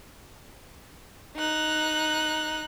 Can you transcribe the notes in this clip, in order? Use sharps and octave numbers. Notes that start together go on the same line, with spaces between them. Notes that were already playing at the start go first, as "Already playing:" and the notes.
D#4 F#6